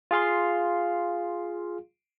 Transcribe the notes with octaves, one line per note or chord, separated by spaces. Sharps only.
F4 G#4 F5 C6